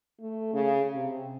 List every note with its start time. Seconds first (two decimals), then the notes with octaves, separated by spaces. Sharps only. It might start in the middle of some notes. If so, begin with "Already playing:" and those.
0.20 A3
0.53 C#3
0.95 C3